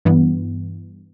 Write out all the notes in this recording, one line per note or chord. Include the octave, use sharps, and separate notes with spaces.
G2 E3 B3